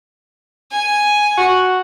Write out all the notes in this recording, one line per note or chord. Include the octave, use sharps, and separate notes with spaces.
G#5
F#4